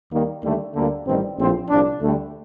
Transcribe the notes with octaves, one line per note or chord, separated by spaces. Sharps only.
D#2 D#3 G3 A#3
D#2 D3 G3 A3
D2 D3 G3 A#3
A1 G2 D#3 G3 C4
A#1 A2 F3 C4
C2 A#2 F3 D4
D2 D3 G3 A3